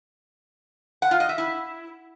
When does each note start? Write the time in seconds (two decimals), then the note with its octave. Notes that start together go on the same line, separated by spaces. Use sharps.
1.02 F#5
1.11 F4
1.20 D#5
1.29 E5
1.38 E4